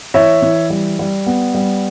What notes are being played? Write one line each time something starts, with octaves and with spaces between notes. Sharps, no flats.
E3 C#5 E5
E3
G3
G3
B3
G3